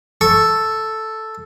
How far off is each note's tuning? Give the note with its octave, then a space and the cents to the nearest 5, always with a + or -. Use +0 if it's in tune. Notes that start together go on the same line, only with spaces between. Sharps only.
A4 +0 C#6 -10